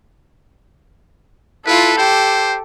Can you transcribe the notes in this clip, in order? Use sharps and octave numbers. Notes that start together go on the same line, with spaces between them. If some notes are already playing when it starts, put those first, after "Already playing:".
E4 F4 A4 B4
G4 C5